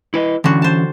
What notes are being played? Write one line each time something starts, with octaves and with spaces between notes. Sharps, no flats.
E4 B4 D#5
D3 E3 G3 C#4 F#4
C5 A5